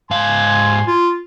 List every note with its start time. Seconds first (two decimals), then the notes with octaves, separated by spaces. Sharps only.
0.11 G#2 F5 G#5 C6
0.87 F4